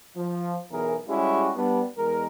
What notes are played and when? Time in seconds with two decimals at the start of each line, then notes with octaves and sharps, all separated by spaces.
0.16 F3
0.70 B1 E2 E3 G#4 A#4
1.08 G3 G#3 C#4 E4 F#4 G4
1.55 G3 B3 D4
1.97 E2 G#3 A#4